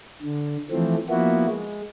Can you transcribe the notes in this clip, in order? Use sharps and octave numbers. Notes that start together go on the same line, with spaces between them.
D3
E3 F3 A3 C4
F3 A#3 B3 E4 F#4
G#3